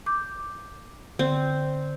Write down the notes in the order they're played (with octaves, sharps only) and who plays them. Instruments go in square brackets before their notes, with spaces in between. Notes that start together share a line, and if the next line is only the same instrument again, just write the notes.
[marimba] D6 G6
[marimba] D3 [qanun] C4